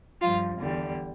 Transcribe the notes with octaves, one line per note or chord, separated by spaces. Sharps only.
G2 F3 F4
E2 D3 G3